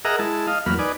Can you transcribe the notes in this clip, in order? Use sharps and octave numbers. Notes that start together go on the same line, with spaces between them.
G#4 A#4 D#5 E5 F#5 A#5
G#3 E4 A5
D#5 F5
E2 F#3 A#3 B5 F6
D#4 B4 D5 G#5